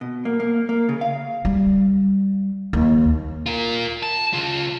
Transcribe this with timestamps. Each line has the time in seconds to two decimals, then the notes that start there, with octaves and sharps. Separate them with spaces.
0.01 B2
0.25 A#3
0.40 A#3
0.69 A#3
0.89 C#3
1.01 F5
1.45 G3
2.73 D#2
3.46 F4 A#4
4.03 A5
4.33 C#3 F4